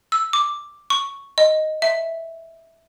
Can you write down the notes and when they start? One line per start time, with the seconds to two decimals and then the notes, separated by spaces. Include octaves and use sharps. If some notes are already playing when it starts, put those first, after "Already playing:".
0.12 E6
0.33 D6
0.90 C#6
1.38 D#5
1.82 E5